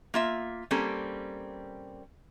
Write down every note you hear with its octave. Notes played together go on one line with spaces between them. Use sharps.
A#3 F4 E5
G3 A#3 C4 C#4 A4